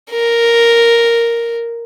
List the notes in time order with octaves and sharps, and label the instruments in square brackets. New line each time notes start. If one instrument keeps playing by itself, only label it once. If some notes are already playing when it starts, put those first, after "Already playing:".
[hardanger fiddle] A#4